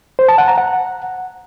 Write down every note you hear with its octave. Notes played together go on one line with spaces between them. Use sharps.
C5
A5
F#5
A#5
F#5